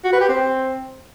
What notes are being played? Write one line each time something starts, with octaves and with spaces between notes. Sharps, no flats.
F#4
B4
G4
C4